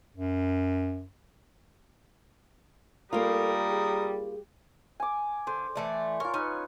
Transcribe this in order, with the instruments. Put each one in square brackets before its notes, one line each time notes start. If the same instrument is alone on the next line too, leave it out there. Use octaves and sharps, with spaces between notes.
[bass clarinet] F#2
[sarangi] G3 [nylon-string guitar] A#3 F4 [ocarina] A4 [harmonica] A#4 D#6
[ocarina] G#4
[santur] G#5 D6
[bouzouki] D3 [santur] C5
[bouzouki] E3 A3 D5
[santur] F4 C#5 [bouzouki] A#4
[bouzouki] C#4 [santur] D#4 B4